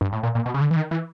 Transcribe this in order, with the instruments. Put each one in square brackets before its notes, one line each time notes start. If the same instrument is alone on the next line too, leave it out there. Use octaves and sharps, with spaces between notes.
[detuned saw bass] G2
A2
A#2
A#2
B2
C#3
D3
E3
D#3
E3